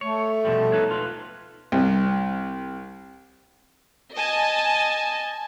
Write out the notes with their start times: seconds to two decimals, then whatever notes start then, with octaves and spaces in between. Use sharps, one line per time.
0.01 A3 C#5
0.45 B2 F3 G3
0.72 D#4 B4 C#5
0.91 F4 B4
1.72 C2
4.15 D#5 G#5 A5